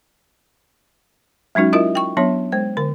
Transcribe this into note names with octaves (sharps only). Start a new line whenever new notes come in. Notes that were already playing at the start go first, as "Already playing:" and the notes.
F#3 G#3 C#4 D#4 F#4
E4 F4 A#4 D#5 E5
G5 C#6
F#3 B3 D4 C#5
G#3 C5
D3 A#4